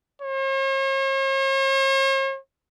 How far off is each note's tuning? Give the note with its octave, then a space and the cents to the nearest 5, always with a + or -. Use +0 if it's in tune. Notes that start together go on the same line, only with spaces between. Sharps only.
C#5 -45